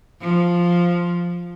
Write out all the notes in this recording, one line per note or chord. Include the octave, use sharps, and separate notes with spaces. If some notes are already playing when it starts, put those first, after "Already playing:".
F3